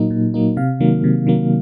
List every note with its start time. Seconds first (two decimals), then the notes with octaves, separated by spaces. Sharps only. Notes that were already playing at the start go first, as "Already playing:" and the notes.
Already playing: A#2 F#3 A#3 D#4
0.10 A#2
0.34 F#3 A#3 D#4
0.57 C3 F5
0.80 D#3 F#3 A#3
1.04 C3
1.27 D#3 F#3 A#3